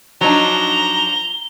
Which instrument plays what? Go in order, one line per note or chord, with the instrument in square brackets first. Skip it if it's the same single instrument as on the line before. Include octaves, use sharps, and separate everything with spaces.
[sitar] F3 D4 [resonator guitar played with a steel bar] F#3 D#4 [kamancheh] A#5 [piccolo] G7